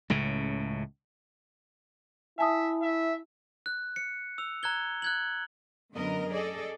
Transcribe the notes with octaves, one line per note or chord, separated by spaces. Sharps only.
C#2 A2 C#3
E4 E5 G#5 A5 D#6
E5
F#6
C#7
E6 F7
A#5 F#6 G#6 G7
F#6 G#6 F#7
F#2 D3 B3 A#4 D#5
G#4 A4 D5 D#5